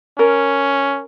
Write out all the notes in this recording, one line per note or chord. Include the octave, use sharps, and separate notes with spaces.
C#4 A#4